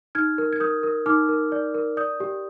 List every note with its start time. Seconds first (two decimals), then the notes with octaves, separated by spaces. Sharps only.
0.15 D#4 F6 G#6
0.38 A#4
0.53 G#6
0.60 A#4 D#6 G6
0.83 A#4
1.06 D#4 D6 F6
1.29 A#4
1.52 D5
1.74 A#4
1.97 D5 D#6 G6
2.20 G4